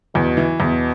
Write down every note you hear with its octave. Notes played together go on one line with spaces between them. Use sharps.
E2 B2
E3
E2 B2